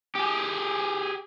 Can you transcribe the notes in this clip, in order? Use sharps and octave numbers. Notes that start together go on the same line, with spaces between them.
G4 G#4